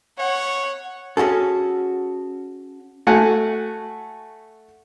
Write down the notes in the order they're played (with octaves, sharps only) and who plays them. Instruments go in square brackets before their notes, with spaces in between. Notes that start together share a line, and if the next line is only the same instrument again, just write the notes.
[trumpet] C#5 [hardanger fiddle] F#5
[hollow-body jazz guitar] C#4 F#4 G#4 A4
[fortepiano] A3 F#4 F#5 G#5